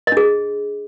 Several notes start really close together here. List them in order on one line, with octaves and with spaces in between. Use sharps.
D#5 D4 G#4